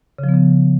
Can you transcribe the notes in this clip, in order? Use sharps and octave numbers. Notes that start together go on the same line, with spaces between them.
C#3
F3
B3
C#3